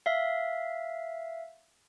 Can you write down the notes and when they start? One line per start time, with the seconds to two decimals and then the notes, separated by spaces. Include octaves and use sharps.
0.06 E5 F5